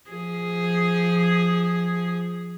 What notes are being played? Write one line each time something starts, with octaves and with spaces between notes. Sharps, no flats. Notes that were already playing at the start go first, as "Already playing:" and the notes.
F3 G#4